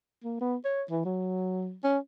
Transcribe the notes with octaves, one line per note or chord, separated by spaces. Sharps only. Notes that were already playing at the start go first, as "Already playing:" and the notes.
A#3
B3
C#5
E3
F#3
C#4